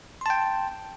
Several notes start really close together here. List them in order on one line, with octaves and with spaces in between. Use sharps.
C6 A5 G5